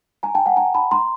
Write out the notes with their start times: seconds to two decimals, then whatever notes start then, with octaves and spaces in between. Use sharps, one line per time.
0.23 G#5 A#5
0.35 G5 A5
0.46 F#5 G#5
0.57 G#5 A#5
0.74 A5 B5
0.91 A#5 C6